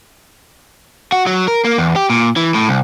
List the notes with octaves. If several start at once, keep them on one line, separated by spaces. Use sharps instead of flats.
F#4
F#3
A#4
A#3
E2
G4
A#2
E3
A2
C2